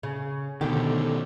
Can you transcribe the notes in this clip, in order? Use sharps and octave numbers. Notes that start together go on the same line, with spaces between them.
C#3
B2 D3 D#3 G4